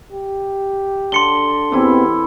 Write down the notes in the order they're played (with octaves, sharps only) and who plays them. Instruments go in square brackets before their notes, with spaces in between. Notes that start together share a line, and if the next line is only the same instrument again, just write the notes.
[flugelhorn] G4
[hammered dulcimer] D3 [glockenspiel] C6 C#7 G7
[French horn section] E2 B3 C4 [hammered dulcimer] E3 E4 [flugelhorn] G4